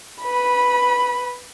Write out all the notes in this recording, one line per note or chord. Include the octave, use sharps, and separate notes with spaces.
B4 B5